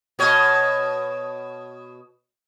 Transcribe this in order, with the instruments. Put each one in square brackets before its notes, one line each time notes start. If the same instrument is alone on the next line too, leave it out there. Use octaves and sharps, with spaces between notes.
[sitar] B2 C#5 D#5